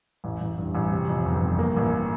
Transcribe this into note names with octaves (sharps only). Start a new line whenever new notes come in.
A1
A1
G2
A1
C3
F2
G1
G1
A#3
A1